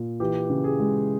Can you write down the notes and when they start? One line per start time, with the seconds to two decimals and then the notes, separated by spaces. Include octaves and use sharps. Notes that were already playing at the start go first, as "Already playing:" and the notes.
Already playing: A#2
0.20 E3 G4
0.50 C#3
0.64 G#4
0.80 G#3